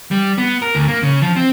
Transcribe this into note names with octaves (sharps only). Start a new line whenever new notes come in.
G3
B3
A#4
D2
A#3
C#3
F3
C4